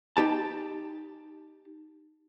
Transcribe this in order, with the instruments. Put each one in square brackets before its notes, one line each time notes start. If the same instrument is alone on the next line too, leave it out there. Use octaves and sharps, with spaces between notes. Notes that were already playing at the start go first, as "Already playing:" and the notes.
[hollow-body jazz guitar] D#4 G4 A5